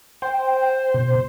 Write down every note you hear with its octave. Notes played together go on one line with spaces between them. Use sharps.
C5 G5
B2